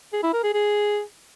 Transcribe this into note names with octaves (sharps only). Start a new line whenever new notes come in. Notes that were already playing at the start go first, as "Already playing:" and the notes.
G#4
E4
A#4
G#4
G#4